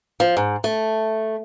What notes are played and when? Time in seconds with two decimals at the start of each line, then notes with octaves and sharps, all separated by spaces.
0.20 F3
0.37 G#2
0.64 A3